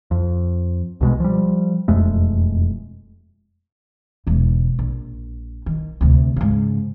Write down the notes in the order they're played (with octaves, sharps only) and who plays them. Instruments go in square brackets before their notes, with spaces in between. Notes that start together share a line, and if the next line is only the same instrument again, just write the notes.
[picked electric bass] F2
C2 B2 G#3
F3 G3
E1 F2 G#3 A3
[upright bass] E1 G#2
A#1
D#3
D2 C3
G#2 C#3